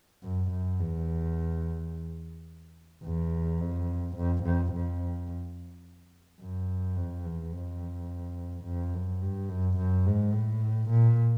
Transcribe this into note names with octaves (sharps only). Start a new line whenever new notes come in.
F#2
F#2
E2
E2
F2
F2
F2
F2
F#2
F2
E2
F2
F2
F#2
G2
F#2
F#2
G#2
A2
A#2